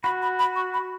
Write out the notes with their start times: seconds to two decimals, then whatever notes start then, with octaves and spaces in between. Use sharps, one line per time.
0.04 F#4 B5
0.22 B5
0.39 B5
0.56 C#6
0.74 B5